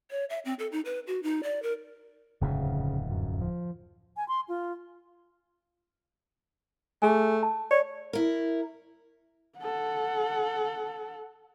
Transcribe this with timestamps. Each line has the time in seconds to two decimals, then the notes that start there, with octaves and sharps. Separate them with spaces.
0.11 C#5
0.30 E5
0.45 C4
0.59 A4
0.72 D#4
0.85 B4
1.07 F#4
1.23 D#4
1.43 D5
1.63 A#4
2.41 D1 F2 G#2 C#3
3.11 F#2
3.41 F3
4.17 G#5
4.28 C6
4.48 F4
7.02 A3 G#4 G#5
7.43 A5
7.71 C#5 D5
8.13 E4 A#4
9.59 A4 F#5